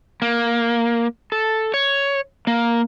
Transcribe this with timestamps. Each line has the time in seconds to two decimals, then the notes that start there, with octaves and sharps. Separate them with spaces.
0.22 A#3
1.32 A4
1.74 C#5
2.47 A#3